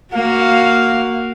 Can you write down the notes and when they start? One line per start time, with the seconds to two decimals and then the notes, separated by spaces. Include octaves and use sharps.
0.13 A#3 F#4 F5